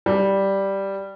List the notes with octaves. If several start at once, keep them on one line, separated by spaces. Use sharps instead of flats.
G3